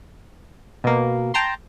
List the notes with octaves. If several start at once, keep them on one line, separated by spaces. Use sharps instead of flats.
B2 A#3
G5 A5 A#5 C6